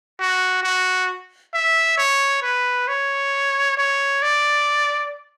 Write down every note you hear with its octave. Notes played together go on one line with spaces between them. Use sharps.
F#4
F#4
E5
C#5
B4
C#5
C#5
D5